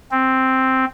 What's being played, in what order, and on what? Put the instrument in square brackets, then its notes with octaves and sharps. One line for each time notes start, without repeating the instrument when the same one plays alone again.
[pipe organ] C4